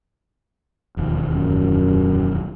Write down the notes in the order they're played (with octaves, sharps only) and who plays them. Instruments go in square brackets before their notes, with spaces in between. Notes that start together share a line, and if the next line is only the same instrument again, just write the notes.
[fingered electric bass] E1 D#2 F3
[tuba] F#2